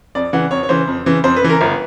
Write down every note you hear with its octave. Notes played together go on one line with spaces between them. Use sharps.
F2 D5
C#3 E3 F#5
F2 C#5
C#5
C#3 E3 C5
F2
C#3 E3
F2 C5
B4
C#3 E3
A#4
G1 B4